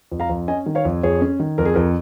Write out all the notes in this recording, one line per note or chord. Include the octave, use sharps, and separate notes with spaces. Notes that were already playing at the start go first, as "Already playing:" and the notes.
F2
F5 A#5
F2
C#4 D#5 G#5
D#3
C#5 F5
F2
F2 G#4 C#5
C#4
D#3
F2 A#4
G#4
F2 A#4